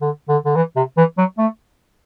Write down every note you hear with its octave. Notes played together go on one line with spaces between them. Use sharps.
D3
D3
D3
E3
C3
E3
F#3
A3